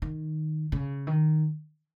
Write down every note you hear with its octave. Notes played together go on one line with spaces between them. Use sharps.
D#3
C#3
D#3